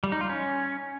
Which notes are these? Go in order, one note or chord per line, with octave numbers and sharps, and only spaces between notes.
G3
D#4
F4
C#4